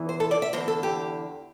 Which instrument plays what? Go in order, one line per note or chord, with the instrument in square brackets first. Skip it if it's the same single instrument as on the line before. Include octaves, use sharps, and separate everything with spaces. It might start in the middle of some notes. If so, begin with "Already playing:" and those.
Already playing: [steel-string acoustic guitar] E2 E3
C5
A4
D5
E5
E2 D3 C5
A4
G4